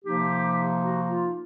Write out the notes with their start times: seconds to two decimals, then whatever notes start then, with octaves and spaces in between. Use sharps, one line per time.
0.05 C3 F3 A#3 D#4 G4
0.83 F#4
1.09 F4